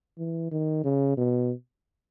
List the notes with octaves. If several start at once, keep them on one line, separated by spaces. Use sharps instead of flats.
E3
D#3
C#3
B2